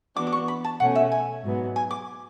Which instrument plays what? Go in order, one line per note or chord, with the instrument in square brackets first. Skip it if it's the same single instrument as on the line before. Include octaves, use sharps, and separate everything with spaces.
[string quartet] E3 B3 D4 F#4 [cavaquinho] D6
[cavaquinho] D6
C#6
B5
A5
[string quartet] B2 A3 C#4 [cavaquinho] F#5
[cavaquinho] E5
G#5
[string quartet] G#2 F#3 B3
[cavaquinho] G#5
D6